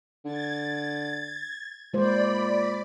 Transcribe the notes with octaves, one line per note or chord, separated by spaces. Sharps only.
D3 G#6 A6
A#2 G#3 C5 D5 B5